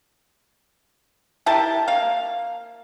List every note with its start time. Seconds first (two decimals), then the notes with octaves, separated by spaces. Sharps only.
1.46 E4 G4 A#4 A5
1.88 A#3 F5